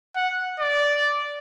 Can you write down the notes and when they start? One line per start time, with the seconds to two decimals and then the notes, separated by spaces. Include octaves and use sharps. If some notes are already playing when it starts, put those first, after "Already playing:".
0.16 F#5
0.60 D5